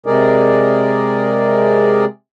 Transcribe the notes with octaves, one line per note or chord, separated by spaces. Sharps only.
C3 G#3 G#4 A#4 D5